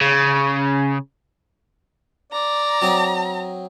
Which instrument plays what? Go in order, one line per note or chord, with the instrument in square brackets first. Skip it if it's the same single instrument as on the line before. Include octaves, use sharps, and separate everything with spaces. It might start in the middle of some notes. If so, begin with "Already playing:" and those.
[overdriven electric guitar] C#3
[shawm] D5 [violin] A#5
[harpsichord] F#3 C4 D#5